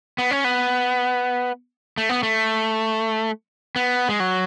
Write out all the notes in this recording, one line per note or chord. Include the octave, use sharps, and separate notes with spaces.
B3
C#4
B3
A3
B3
A3
B3
G#3
F#3